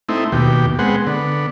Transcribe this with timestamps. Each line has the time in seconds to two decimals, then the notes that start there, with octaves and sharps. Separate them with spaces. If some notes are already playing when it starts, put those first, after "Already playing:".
0.09 A3 C4 D#4 E4
0.32 D#2 B2 G4
0.79 G#3 B3 C4 F#5
1.07 D3 B3